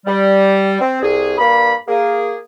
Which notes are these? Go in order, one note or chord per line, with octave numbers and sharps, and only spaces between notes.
G3
C4
C2 G#4
G2 A#3 B5
A#3 G#4